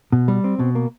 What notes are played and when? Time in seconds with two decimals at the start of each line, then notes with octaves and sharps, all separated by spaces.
0.13 B2
0.28 G3
0.44 C4
0.59 B2
0.75 A#3